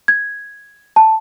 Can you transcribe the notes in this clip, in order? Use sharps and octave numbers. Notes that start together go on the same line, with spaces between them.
G#6
A5